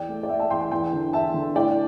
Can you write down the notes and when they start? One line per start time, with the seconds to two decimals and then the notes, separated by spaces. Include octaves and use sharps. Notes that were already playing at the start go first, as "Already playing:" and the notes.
Already playing: E2 D5 G5
0.09 A3
0.23 D5
0.29 A3 E5
0.40 E5 A5
0.50 E2 G5 C6
0.61 G5 C6
0.72 E2 G5 C6
0.93 D3
1.13 E2 E5 A5
1.34 D3
1.55 A2 D5 G5